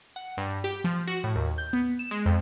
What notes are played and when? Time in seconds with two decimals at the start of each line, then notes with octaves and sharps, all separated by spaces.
0.16 F#5
0.37 G2
0.64 G4
0.84 F3
1.07 F#4
1.24 A2
1.35 D#2
1.58 G6
1.73 B3
1.99 E7
2.11 G#3
2.26 F2